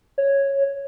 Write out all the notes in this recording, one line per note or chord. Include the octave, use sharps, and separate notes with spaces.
C#5